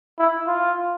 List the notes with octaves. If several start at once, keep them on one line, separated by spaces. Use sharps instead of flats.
E4
F4